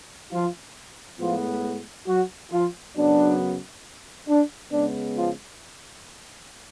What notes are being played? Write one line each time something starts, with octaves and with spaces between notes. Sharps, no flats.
F3 F4
A2 F3 G#3 B3 F4
F#3 F#4
F3 F4
F#2 C#3 F#3 B3 D4
D4
C#3 G#3 B3 D4
F3 F4